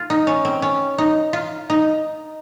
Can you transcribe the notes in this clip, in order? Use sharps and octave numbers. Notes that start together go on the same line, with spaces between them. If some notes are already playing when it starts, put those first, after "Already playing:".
Already playing: F4
D#4
C#4
C4
C#4
D#4
F4
D#4